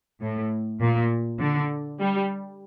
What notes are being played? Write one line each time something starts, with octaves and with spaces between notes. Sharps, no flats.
A2
A#2
D3
G3